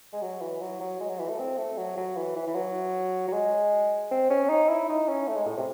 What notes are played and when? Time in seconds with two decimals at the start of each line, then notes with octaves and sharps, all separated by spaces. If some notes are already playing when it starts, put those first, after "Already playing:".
0.13 G#3
0.22 F#3
0.41 E3
0.61 F#3
0.80 F#3
1.00 G#3
1.09 F#3
1.19 E3
1.29 A3
1.39 C4
1.58 A3
1.77 F#3
1.97 F#3
2.17 E3
2.36 E3
2.47 E3
2.55 F#3
3.28 F#3
3.33 G#3
4.11 C4
4.30 C#4
4.49 D#4
4.69 E4
4.89 D#4
5.08 C#4
5.28 A3
5.36 G#3
5.47 A2
5.57 C3